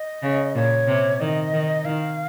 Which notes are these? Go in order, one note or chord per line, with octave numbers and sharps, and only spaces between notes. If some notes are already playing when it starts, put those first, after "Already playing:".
Already playing: D#5
C#3
A#2 C#5
C3
D#3 D#5
D#3
D#3 F5